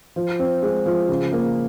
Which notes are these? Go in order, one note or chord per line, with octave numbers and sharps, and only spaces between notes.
F3
C4
G#3
F3
C#3
A#3